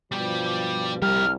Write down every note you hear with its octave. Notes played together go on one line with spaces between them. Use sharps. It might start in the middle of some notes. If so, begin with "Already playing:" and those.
G2 B2 F3 G3 G4
C2 F3 G3 A#4 F6